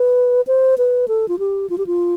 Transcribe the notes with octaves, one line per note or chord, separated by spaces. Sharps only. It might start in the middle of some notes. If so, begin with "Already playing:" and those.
Already playing: B4
C5
B4
A4
F4
G4
F4
G4
F4